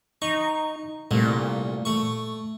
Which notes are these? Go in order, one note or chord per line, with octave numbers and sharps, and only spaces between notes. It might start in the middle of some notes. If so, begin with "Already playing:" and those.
D#4 C#6
C2 A#2 A3
A3 C#6